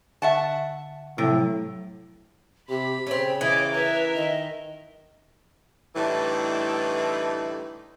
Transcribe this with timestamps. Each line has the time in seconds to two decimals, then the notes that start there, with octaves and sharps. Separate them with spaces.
0.22 D3 E5 F#5 A5
1.18 A2 C3 F3 F#3 E6
2.69 C3 G4 B5
3.07 C#3 A3 C4 C#5
3.41 E3 D#5 D6
3.73 A#4 B4 E5
4.15 D#3 D#5
5.96 A2 D3 E3 G3 A3 D#4